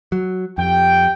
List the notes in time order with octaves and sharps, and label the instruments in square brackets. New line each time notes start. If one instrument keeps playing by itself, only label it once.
[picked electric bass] F#3
[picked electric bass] F2 [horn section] G4 G5